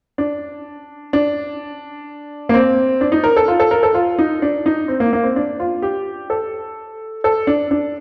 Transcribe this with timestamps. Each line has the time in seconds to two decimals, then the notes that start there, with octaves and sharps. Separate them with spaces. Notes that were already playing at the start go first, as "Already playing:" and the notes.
0.18 D4
1.13 D4
2.49 A#3
2.54 C4
3.01 D4
3.12 D#4
3.24 A#4
3.37 A4
3.48 F4
3.60 A4
3.71 A#4
3.83 A4
3.95 F4
4.19 D#4
4.42 D4
4.66 D#4
4.88 C4
5.00 A#3
5.13 A#3
5.23 C4
5.36 D4
5.60 F4
5.82 G4
6.30 A4
7.24 A4
7.47 D4
7.71 D4